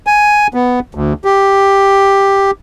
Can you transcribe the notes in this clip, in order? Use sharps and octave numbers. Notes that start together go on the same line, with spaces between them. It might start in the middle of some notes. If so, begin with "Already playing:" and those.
G#5
B3
D2
G4